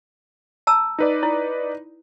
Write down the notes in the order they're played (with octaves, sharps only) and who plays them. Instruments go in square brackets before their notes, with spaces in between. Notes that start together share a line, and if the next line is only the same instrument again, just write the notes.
[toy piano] A5 A#5 E6
[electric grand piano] D#4 B4 D5
[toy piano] E4